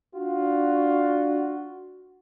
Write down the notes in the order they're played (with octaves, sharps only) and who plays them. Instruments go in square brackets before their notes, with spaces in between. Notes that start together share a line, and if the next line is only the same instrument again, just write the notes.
[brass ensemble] D4 F4 [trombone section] F#4